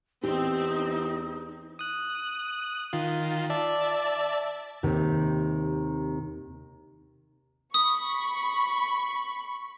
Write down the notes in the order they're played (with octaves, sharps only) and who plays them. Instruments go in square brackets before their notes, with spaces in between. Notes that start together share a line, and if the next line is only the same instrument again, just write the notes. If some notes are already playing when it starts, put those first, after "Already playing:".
[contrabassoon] E2 [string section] C4 [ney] D#4 [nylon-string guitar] G4
[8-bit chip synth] D#6 F#6
D#3 F4
D5 E5 A5
[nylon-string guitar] D#2 C3 D#3
[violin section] B5 C#6 [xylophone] D#6